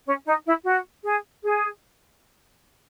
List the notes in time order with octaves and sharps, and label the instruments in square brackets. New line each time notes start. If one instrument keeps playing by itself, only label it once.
[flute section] C#4
D#4
E4
F#4
G#4
G#4